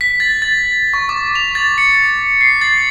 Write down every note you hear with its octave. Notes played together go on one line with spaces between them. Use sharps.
B6
A6
A6
C#6
D6
F7
A6
C#7
C7
A6